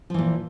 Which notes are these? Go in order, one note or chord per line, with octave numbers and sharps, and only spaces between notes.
A#2 E3 F3